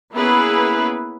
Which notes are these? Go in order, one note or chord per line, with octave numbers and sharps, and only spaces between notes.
A#3 B3 C#4 E4 G#4 B4